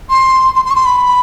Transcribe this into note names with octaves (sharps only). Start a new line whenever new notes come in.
C6
C6
C6
C#6
C6
B5